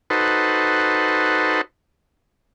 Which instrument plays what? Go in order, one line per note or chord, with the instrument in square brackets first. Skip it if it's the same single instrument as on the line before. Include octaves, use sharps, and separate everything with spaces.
[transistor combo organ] D#4 F#4 A4 B4 C5